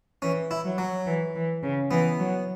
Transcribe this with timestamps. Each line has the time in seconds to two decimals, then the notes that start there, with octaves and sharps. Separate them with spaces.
0.22 E3 C#4
0.51 E4
0.65 F#3
0.78 F#3
1.06 E3
1.35 E3
1.63 C#3
1.91 E3 B3
2.19 F#3